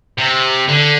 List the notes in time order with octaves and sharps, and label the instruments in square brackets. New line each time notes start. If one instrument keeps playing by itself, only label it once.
[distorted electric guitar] C3
D3